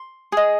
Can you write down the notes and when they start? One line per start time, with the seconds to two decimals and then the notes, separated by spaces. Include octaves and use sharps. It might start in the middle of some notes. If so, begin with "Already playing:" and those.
Already playing: C6
0.32 G#4 D#5